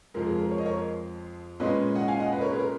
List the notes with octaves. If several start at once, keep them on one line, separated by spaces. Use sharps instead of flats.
F2 F3 G#3 A#4
G#4
A#4
C#5
D#5
A#4 C#5
A#2 G#3 C#4 B4 D#5
D#5 F#5
F5 G#5
D#5 F#5
B4 D#5
A#4 C#5
G#4 B4
A#4